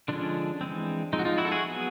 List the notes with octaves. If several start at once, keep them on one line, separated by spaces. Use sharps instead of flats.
D3 F3 G#3 C#4 D4
E3 G#3 C4
F3 G#3 C4 D#4
F#4
D#4 F4
E4 F#4
A4
F#4 G#4
F#3 B3